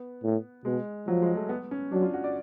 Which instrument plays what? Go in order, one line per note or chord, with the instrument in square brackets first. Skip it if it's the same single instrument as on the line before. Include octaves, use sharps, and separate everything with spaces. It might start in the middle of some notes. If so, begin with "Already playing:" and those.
Already playing: [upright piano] B3
[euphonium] A2
[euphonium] B2 [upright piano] G#3
[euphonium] F3 [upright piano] F#3
[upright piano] G#3
A3
B3
C#4
[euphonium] F#3 [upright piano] D4
[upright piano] F4
F#4
D5